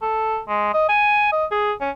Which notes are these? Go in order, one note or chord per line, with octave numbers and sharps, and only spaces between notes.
A4
G#3
D#5
G#5
D#5
G#4
C#4